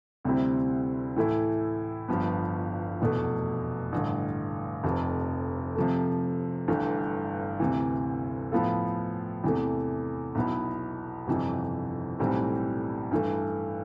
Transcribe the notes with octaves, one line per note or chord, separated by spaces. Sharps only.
D2 C3 G3 C4 E4
A2 E3 A3 E4
G1 G2 F3 B3
F1 E2 B2 A3
A1 G2 D3
F1 F2 C3
C3 F3 A3
G1 G2 E3 A3
D2 C3 E3
A2 F3 B3 F4 A4
E2 C3 E3 A3
B1 B2 B3 E4
G1 F2 C3 E3
B1 A2 E3 G3 C4
G2 E3 A3